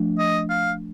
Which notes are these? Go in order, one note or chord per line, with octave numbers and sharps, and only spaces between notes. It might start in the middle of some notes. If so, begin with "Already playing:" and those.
Already playing: F3 A3 D4
D#5
F5